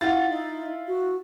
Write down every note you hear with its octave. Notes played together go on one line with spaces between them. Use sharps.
E4 F4 F#5 A6
D#4
F#4